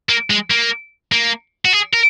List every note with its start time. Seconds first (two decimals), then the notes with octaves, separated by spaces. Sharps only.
0.09 A#3
0.30 G#3
0.50 A#3
1.12 A#3
1.65 F#4
1.73 G#4
1.93 A#4